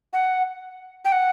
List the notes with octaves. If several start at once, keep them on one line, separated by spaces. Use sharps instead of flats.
F#5
G5
F#5